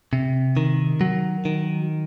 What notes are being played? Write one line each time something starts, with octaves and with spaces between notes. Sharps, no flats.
C3
D#3
F#3
D#3